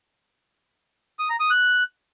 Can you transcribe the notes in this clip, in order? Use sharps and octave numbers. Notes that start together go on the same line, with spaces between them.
D#6
A#5
D#6
F#6